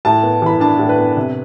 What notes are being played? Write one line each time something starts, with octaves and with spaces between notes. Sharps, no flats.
A2 A5
B3
E3 B5
D4 A5
A2
B4
B3
C3